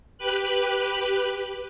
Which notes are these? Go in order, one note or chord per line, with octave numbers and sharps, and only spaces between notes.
G4 B4 F#6